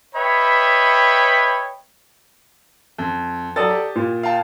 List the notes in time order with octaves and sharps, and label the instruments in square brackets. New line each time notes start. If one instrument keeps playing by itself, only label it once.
[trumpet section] B4 C#5 D#5 E5 G5 B5
[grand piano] F2
[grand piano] F#3 D#6 A6 [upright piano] A4 D5
[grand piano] G4
[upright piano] A#2
[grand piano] F5 G5 A5